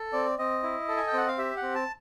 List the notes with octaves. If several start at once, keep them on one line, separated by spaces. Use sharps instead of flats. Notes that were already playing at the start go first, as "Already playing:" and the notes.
Already playing: A4
C4 D5
C4 D#5
E4
A4
G#5
G5
C4 F#5
F5
G4 E5
F#5
C4
A5